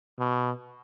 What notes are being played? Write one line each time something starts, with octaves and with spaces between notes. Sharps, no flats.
B2